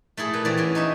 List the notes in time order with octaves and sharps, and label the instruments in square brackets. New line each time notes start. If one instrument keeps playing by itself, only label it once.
[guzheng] A3 E4 G#4 A4
A#2 B4
E3 C4 F#4 D5
C#4 C#5
D#4 C#5 E5